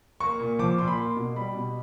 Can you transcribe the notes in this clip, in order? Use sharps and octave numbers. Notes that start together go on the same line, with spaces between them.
A#3 C#6
A#2
F3 D6
A#2 C6
B5
A#3 C6
B2
G3 B5
B2